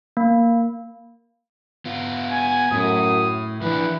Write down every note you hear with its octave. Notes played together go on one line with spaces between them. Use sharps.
A#3
B3 F4
G#5
F#2 A2 D#6
E3 F3 D4 B4